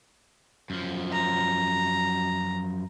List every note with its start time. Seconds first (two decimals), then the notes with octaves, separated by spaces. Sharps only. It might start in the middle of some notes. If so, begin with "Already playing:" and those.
0.70 F#2 F3
1.12 A#5